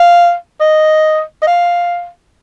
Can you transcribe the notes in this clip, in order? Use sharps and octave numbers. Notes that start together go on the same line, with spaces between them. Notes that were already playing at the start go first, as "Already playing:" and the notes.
Already playing: F5
D#5
D#5
F5